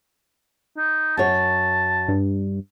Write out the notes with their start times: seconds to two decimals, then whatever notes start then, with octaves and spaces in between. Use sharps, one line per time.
0.78 D#4
1.17 F#2 C#5 A5
2.08 G2